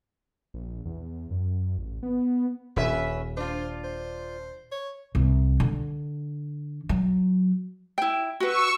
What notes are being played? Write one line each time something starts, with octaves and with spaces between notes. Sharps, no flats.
A#1
E2
F#2
A1
B3
D#1 C#4 B4 E5
D4 F4 C5
C5
C#5
C2
D3
F#3
E4 G5
F#4 B4 C#6 E6